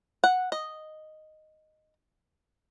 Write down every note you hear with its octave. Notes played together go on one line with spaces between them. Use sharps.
F#5
D#5